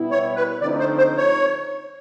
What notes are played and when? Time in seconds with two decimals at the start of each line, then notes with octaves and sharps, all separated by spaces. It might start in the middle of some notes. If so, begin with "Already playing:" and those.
Already playing: B2 G3 B3 E4
0.11 C#5
0.36 B4
0.61 D3 F3 A3 C4 D#4 D5
0.79 C5
0.98 C5
1.17 C#5